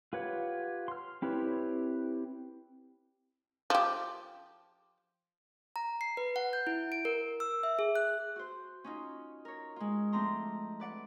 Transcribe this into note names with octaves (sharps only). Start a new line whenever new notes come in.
F4 G4 B4 C#5 F#5
C6 F6
C4 E4 G4 B4 C#5
F3 G4
A#5
C7
B4
F#5
G6
E4
D7
A#4
E6
E5
G#4
F#6
F#4 C5
C#4 D#4 F4
A#4 C#5
G#3 F4
F3 A3 C4 D4 A#5 C6
B4 D5 F#5